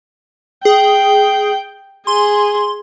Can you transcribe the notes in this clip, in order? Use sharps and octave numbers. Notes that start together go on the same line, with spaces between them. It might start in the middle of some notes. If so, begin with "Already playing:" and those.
G#4 G5
G#4 C6